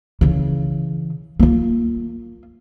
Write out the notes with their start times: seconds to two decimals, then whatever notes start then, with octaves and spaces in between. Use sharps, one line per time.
0.21 C#3 E3
1.39 A#3 F4